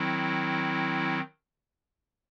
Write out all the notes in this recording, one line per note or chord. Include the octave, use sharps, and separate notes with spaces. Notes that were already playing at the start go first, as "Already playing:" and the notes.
Already playing: D#3 F#3 C4 E4